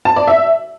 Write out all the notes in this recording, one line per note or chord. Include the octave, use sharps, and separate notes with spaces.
A5
D5
E5